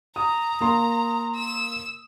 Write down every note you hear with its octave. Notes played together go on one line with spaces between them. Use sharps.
A#5 D#6
A#3 A#5 C6
E6